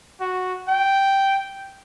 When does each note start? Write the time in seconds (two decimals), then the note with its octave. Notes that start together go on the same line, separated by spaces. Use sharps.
0.20 F#4
0.68 G5